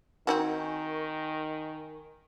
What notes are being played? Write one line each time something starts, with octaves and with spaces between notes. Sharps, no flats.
D#3 C4 D#4 F#4 A#4 G#5 C#6